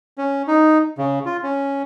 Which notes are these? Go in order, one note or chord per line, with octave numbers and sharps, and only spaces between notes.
C#4
D#4
C#3
F4
C#4